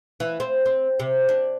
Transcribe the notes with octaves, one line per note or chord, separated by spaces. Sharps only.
E3
C4
C4
C3
D4